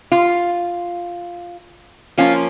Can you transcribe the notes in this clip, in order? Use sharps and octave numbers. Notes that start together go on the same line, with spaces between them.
F4
F3 A#3 C#4 F4